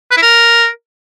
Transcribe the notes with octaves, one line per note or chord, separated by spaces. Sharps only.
B4
E4
A#4